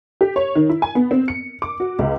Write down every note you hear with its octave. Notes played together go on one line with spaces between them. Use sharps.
G4
C#5
D#3
E4
G#5
B3
C4
C#7
D6
F#4
C#2